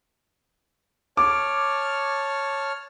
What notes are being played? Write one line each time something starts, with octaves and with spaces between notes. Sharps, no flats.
C#5 A5 D6 F6